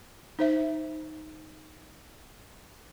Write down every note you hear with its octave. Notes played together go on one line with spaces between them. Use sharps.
D#4 C5 E5